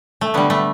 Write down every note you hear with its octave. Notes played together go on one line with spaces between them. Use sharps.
A3
D3 G3 B3
A3